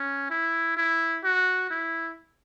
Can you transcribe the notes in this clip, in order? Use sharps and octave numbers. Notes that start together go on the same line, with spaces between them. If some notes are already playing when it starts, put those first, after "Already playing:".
Already playing: C#4
E4
E4
F#4
E4